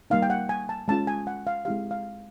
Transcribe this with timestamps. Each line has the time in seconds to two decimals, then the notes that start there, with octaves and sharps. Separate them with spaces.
0.10 G3 A#3 D#4 F5
0.22 G5
0.30 F#5
0.49 G#5
0.69 A5
0.88 G#3 C#4 F4 A5
1.07 G#5
1.27 F#5
1.47 F5
1.65 G#3 C4 E4 G4 F5
1.91 F5